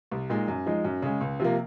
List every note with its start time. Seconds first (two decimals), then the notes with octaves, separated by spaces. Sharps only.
0.11 C2
0.30 A#2 G#3 D#4
0.48 F#2
0.66 F3 G#3 D#4
0.85 F#2
1.02 C#3 G#3
1.21 C#2
1.40 C3 F3 A#3